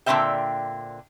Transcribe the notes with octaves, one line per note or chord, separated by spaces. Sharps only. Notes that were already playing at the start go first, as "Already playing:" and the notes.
A#2 D3 A3 C4 E5 G5